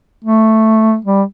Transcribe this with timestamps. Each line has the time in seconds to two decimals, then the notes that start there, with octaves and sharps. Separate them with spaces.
0.24 A3
1.05 G3